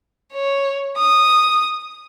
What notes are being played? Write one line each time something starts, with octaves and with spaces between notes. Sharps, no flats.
C#5
D#6